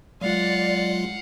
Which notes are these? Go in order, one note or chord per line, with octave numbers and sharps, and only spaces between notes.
F#3 G#3 F4 D5 F5 F#5